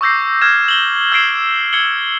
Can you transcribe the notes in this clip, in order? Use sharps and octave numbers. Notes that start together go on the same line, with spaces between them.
C#6 D6 E6 G6 A#6 C7
F6 G#6 E7
F#7 G7
E6 F6 G#6 C7 D7 E7
G#6 C#7 F#7 G7